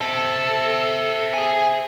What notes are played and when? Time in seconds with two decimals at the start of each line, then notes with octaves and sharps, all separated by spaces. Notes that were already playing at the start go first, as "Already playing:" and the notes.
0.01 A4 C5 E5
1.34 G#4 G#5